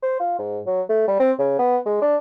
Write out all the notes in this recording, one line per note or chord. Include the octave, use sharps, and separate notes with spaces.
C5
F4
G#2
F#3
A3
G3
C4
C#3
B3
G#3
D4